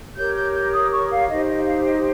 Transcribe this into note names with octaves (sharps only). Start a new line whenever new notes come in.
G4 A#4 C#5 G6
G6
G6
D#6
C#6
F5
D#4 G4 C5 D#5
D#5
F5
D#5